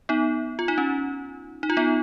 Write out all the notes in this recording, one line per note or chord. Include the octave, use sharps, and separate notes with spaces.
B3 D#4
F4
D#4
C#4
D#4
F4
B3 D#4